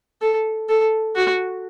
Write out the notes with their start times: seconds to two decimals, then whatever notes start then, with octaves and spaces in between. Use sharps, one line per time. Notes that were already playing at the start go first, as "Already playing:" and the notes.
0.22 A4
0.69 A4
1.15 F#4